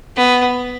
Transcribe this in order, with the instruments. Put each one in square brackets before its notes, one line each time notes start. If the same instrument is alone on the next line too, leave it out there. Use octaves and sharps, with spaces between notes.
[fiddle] B3